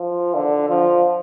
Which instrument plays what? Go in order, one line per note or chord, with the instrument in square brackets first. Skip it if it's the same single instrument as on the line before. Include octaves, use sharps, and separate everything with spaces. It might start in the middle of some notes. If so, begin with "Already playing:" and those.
Already playing: [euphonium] F3
D3
F3